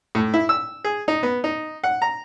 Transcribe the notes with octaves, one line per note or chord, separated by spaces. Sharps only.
A2
E4
E6
G#4
D#4
B3
D#4
F#5
A#5